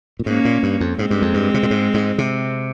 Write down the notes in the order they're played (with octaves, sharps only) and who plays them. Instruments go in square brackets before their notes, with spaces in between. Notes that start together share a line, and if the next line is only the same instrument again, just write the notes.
[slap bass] A#2
[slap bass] G#2 [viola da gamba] A#3 C#4
[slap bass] A#2
G2
F2
[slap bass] G#2 [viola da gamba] G#3 C4
[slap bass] G2
F2
G2
C3
A#2
G#2
G#2
C3